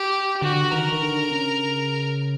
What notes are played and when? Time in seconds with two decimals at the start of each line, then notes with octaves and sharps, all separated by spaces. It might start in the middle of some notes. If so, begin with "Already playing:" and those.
Already playing: G4
0.42 D3 F#4
0.72 D#3 A#4
0.92 D#3
1.02 D3
1.31 C#3